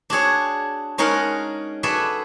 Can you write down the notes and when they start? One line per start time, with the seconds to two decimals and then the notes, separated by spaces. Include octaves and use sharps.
0.10 D4 F#4 G#4 C#5
0.98 G#3 C#4 D#4 G#4 A#4 F#5
1.83 F#4 G#4 A4 B4 D5 E5